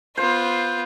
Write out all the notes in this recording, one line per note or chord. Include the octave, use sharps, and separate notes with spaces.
B3 F4 C5